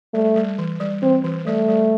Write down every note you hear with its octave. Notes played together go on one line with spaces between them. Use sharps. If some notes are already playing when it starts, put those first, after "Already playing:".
G3 A3
G3
E3
G3
E3 C4
E3
G3 A3
G3